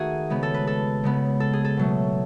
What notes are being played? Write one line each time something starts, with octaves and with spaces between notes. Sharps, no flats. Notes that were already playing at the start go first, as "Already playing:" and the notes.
Already playing: D#3 A3 F#4 G#4
C#3 G#3 B3
A4
B4
A4
C#3 G#3 B3
A4
G#4
A4
B2 F#3 A3